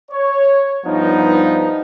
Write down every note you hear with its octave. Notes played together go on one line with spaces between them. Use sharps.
C#5
G2 F3 B3 D#4